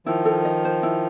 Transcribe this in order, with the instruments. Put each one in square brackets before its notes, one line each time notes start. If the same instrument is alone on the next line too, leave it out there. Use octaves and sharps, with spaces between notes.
[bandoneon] D#3 F3 [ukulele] E4
[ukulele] A4
D#5
C5
E4